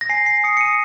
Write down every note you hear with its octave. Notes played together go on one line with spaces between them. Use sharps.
A#6
G#5 C7
C7
D#6 C#7
C#7
D#7